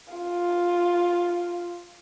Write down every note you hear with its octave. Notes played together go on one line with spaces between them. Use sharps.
F4